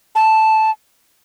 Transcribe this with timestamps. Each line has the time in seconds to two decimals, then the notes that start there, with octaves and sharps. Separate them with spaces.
0.15 A5